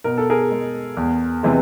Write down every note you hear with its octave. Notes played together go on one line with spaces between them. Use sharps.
B2 A#4
A4
G#4 A#4
G#3
E2
C3 E3 G#3